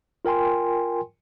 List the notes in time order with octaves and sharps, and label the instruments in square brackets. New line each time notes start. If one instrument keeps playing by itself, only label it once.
[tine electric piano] F4 A#4 G5 G#5 C6